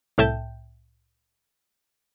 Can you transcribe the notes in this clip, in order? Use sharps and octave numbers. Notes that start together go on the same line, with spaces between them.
C2 A2 E5 G5 A5 G6